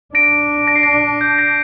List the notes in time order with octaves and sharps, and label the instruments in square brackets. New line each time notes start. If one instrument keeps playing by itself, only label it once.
[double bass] D4 [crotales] A#6 D7
[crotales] A#6
C7
A#6
G6
A#6